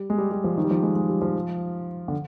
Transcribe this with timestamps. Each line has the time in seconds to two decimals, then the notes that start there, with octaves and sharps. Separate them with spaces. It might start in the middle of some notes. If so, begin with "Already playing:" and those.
Already playing: G3
0.10 G#3
0.18 G3
0.31 G3
0.44 F3
0.57 D#3
0.64 G3
0.71 F3
0.83 G#3
0.96 G#3
1.10 G3
1.22 F3
2.08 D3